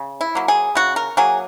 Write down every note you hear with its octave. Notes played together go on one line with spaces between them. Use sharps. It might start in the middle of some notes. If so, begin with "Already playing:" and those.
Already playing: C#3
E4
F#3 A#3
G#4
C#3 F#4
A#4
F#3 A#3 G#4